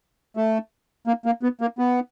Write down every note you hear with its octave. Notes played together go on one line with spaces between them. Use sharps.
A3
A#3
A#3
B3
A#3
B3